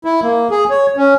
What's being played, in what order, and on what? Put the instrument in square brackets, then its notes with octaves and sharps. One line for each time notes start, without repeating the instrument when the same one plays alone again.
[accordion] E4
A#3
G#4
C#5
C#4